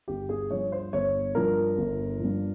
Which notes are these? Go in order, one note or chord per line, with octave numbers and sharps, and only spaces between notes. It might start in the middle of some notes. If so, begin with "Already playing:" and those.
G1 G4
G#4
G2 F3 C#5
C5
G1 C#5
G2 F3 A#4
G1
G2 F3